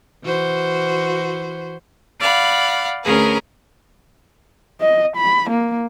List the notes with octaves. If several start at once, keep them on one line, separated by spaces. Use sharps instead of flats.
E3 F#4 C5
D5 F5 F#5 B5
D2 C#4 G#4 A#4 B4
D#5
B5
A#3